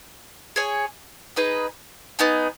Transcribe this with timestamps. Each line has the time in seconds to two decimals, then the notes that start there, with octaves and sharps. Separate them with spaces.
0.56 G#4 C#5 G#5
1.36 D#4 G#4 B4 D#5
2.19 B3 D#4 G#4